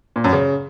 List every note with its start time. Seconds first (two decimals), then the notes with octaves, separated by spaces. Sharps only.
0.16 A#2
0.24 F#2
0.33 C#3